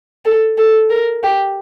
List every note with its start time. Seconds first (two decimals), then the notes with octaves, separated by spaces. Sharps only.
0.25 A4
0.58 A4
0.90 A#4
1.23 G4